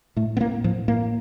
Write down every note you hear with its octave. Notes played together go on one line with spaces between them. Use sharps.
A2 A3
B3
A2 A#3
A2 F3
A2 A#3